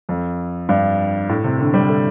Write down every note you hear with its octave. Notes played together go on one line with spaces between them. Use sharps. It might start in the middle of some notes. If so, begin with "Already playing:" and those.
F2
G2
A2
C3
D3
G3
A3